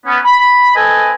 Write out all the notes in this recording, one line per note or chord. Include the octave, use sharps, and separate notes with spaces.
B3 C#4
B5
C4 A4 B4 D#5 G#5